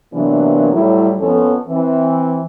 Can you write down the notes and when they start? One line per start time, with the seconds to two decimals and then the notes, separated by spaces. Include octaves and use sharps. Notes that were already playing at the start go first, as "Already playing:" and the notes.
0.14 C3 E3 F#3 A#3 B3 D4
0.72 A2 F#3 G3 E4
1.20 F2 F3 B3 C#4 A4
1.69 E3 C4